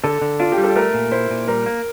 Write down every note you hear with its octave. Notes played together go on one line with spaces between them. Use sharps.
D3 A4
D3
D4 F4
G4
G3
A4
A3 A#4
A#2
E4 C5
A#2
G3 A#4
A#3